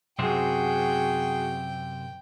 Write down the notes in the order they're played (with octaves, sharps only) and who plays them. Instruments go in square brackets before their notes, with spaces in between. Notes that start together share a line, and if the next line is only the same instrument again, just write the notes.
[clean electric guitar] F#2 C3 C4 [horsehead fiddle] F#4 G#4 [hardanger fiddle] G5